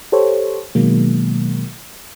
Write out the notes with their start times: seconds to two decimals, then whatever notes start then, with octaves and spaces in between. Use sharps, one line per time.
0.12 G4 A4 C5 C#5
0.75 B2 D#3 F#3 G#3 A#3